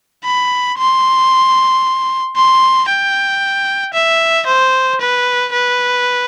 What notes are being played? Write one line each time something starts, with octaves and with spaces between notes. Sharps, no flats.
B5
C6
C6
G5
E5
C5
B4
B4